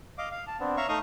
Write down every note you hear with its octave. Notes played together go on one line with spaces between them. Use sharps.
D#5 F5 D6
F5
A5
B3 C4 D4
C#5 E5 F5 A#5 C#6
A3 D#4 D#5 F5 C#6 D#6